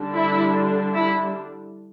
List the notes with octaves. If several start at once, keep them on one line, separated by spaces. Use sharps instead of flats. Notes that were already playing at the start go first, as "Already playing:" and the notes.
Already playing: D3 G3 D4
E4
E4